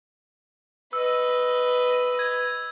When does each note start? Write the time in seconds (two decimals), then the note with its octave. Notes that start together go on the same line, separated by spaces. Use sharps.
0.93 B4 D#5 E6
2.19 G#6